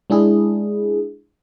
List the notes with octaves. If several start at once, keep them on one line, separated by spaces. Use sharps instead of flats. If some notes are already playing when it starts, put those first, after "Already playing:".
G#3 D4 E4 G#4